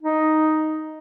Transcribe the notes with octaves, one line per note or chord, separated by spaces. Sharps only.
D#4